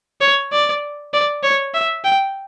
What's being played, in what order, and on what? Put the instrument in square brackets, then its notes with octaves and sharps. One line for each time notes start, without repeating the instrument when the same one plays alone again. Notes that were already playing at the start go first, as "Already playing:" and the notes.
[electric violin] C#5
D5
D5
C#5
E5
G5